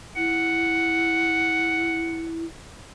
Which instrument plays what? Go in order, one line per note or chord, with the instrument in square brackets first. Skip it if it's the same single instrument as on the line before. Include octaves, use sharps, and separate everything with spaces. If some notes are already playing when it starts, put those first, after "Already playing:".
[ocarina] E4 [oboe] F#5